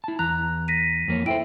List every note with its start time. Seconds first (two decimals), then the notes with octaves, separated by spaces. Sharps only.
0.04 E4 A5
0.19 E2 A#5 F#6
0.68 A#6 B6 D#7
1.08 F2 A#3 C#5
1.26 E4 A4 C5 E5 G5 D7